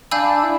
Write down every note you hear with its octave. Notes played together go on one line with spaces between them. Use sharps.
D4 F5 G#5 B5 E6 G6
E4